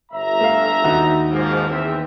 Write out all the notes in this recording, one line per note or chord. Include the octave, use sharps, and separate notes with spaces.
G1 E5 A#5
A3 F5
D#2 D#4 F#4
G#2 F3 A#3
E2 C4 E5